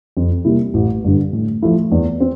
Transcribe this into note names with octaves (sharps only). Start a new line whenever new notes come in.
F2
C3 G3 A#3 E4
A1
G2 D3
A2
F3 A3 E4
E2
C4